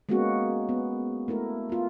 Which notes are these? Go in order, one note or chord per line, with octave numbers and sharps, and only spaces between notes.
G#3 A#3 B3 C#4 F#4 G#4
B3
A3 E4 A#4
B3 F4